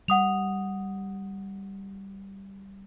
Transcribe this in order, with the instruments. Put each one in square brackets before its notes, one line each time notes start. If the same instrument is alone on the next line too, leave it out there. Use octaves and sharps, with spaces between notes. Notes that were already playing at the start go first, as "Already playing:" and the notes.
[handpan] G3 [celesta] F#5 D#6 F7